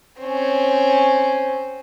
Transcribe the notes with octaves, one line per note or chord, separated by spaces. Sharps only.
C4 C#4